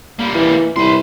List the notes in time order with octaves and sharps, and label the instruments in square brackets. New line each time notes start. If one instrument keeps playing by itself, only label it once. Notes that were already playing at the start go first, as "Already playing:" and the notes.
[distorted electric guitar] G3 A#3
[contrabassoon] E3
[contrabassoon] C2 [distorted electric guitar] B4 C6